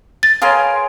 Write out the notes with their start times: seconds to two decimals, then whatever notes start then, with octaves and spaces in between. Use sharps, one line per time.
0.23 A6
0.42 G#4 A#4 B4 C#5 F5 G5 G#5 C6